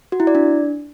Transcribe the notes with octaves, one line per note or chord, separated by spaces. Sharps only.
F#4
E4
D5
D4